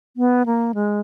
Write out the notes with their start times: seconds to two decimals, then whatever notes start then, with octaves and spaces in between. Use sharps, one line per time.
0.17 B3
0.46 A#3
0.74 G#3